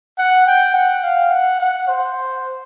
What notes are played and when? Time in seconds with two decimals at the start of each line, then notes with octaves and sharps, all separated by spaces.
0.18 F#5
0.47 G5
0.74 F#5
1.03 F5
1.31 F#5
1.60 F#5
1.88 C5